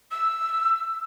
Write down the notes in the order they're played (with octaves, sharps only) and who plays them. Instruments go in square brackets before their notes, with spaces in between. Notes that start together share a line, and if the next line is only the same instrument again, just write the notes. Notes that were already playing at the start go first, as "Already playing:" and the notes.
[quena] E6